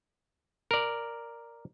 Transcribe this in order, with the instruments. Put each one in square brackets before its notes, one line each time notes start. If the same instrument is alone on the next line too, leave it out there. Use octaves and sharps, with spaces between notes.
[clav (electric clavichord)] A#4 D5